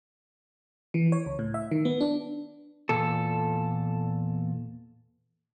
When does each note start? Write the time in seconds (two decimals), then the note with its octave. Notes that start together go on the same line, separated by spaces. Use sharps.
0.94 E3
1.12 C#5
1.26 C#2
1.39 A2
1.54 E5
1.72 D#3
1.85 B3
2.01 D4
2.89 E2 A#2 A4